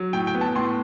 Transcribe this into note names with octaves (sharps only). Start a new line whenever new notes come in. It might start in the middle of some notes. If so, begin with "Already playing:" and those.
Already playing: F#3
A2 G5
G5
B3
A5
A2 C6